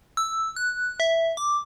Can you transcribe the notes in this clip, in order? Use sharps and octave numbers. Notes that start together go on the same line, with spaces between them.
E6
F#6
E5
D6